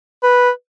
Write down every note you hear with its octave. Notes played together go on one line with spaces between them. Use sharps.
B4